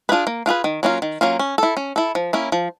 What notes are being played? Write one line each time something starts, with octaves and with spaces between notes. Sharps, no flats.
D4 F4 G#4 B4
A#3
D4 F4 G#4 B4
D#3
F#3 A#3 C#4 F4
D#3
F#3 A#3 C#4 F4
C#4
E4 A4
C#4
E4 A4
F3
A#3 C#4 E4
F3